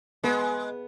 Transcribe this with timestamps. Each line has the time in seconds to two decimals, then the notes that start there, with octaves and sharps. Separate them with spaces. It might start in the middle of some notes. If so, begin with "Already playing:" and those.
0.24 G#3 B3